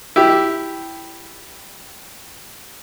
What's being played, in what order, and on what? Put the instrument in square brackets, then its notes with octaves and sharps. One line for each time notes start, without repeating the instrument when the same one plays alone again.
[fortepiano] E4 G4